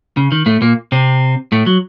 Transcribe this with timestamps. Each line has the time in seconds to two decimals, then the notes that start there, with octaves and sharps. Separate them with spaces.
0.17 C#3
0.32 D#3
0.46 A2 A3
0.62 A#2 A#3
0.92 C3 C4
1.52 A2 A3
1.66 F#3